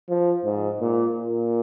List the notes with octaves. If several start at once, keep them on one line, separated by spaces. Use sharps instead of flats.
F3
G#2
A#2
A#2